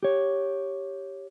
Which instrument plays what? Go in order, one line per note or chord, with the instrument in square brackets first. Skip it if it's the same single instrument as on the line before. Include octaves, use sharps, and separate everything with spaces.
[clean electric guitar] G4 C#5